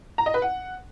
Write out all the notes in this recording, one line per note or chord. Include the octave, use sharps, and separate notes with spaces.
A#5
D#5
B4
F#5